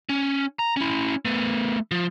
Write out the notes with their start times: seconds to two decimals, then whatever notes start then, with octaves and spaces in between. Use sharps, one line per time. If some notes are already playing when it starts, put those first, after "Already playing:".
0.09 C#4
0.59 A#5
0.77 C#4 E4
1.25 A3 B3
1.91 F3